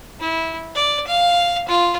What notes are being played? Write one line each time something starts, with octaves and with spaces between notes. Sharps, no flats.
E4
D5
F5
F4